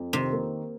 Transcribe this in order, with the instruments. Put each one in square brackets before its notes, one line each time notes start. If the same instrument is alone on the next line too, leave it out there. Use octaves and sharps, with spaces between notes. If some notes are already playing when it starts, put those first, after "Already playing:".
Already playing: [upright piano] F2
[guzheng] C3 [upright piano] D#3
[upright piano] A#3